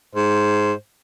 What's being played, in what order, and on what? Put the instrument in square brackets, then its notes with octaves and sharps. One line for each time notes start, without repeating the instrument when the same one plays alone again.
[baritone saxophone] G#2 [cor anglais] C5